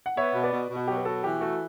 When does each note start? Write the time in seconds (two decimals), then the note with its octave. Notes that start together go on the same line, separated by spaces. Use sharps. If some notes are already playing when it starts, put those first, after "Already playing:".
0.06 F#5
0.17 B3 C#5 E5
0.35 B2
0.43 B4 D5
0.53 B2
0.70 B2
0.76 F#4
0.88 F#3 G4
0.97 B4
1.05 B2 F#4 A4
1.24 E3 G4
1.41 A3 F#4 A4